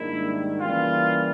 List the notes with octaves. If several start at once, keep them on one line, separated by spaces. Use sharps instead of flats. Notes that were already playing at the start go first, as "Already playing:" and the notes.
Already playing: G#2 D#3 G3 A#3 D4 E4
C#3 E3 G3 A#3 F4